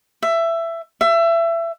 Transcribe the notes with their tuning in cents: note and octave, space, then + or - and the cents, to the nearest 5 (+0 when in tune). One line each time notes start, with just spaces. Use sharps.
E5 +15
E5 +25